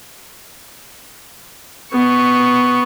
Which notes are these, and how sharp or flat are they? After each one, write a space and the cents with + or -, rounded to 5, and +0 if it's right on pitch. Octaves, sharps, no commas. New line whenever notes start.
B3 +5 C#6 +0